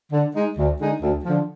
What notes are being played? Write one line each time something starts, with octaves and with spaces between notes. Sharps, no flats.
D3
G#3 D#4
D2
D3 G#3 D#4 G#4
D2
D3 F3